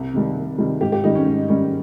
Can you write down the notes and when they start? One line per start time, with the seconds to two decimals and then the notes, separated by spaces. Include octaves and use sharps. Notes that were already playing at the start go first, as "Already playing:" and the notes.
Already playing: C2
0.14 C3 D#3 G3
0.37 C2
0.58 C3 D#3 G3
0.81 G#2 G4
0.92 G4
1.04 D#3 G3 C#4 D#4
1.15 C#4
1.26 G#2
1.49 D#3 G3 C#4